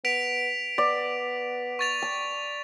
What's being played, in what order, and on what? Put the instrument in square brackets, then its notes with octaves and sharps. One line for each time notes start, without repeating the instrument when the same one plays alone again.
[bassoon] B3 [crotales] B6 D7 F7
[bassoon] B3 [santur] D5
[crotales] C#6 A6 F7
[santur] A5